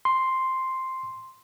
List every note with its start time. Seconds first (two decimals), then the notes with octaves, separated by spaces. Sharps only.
0.05 C6